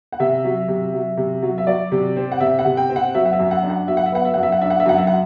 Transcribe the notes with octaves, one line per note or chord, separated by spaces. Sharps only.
F#5
C3 E5
F#3
C3
F#3
C3
F#3
E5
F#3 D5
C3
C4
F#5
C3 E5
F#5
C3
G5
C4
F#5
F#3 E5
F#5
E5
F#2
F#5
D4
F#5
F#3 E5
F#5
E5
B3 F#5
E5
F#2 F#5
E5
F#5
D4 E5
F#5
E5
F#2 F#5
E5
F#5